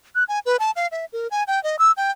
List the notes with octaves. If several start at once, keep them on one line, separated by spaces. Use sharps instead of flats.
F#6
G#5
B4
A5
F5
E5
A#4
G#5
G5
D#5
E6
G5